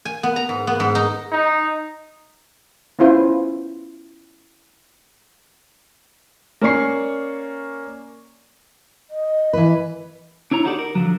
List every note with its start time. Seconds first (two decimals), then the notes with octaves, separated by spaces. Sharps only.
0.05 G#5
0.23 B3
0.36 A#5
0.49 G#2
0.67 B3
0.80 G#2
0.95 D#4
1.32 D#4
2.99 B3 C#4 E4 F4 C5
6.61 A#3 C#4 D5 C#6 C7
9.10 D#5
9.53 E3 B4
10.51 D4 E4 C#5 A#5
10.65 D#4 E4 F#4 G4 A4 D5
10.79 A#4
10.95 D3 F3 F#3